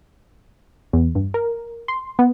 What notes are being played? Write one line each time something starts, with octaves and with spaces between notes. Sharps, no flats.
E2
G2
A#4
C6
B3